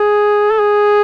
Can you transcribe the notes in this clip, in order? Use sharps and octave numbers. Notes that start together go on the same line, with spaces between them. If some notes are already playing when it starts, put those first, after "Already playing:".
Already playing: G#4
A4
G#4